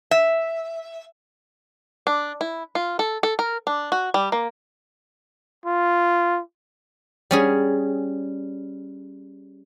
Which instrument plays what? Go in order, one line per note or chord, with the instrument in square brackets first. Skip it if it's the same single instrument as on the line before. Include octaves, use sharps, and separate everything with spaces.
[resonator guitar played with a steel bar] E5
[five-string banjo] D4
E4
F4
A4
A4
A#4
D4
F#4
G3
A#3
[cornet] F4
[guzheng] G3 C#4 G#4